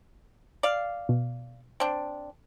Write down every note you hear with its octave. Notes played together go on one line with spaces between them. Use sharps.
D5 F5
B2
C4 D4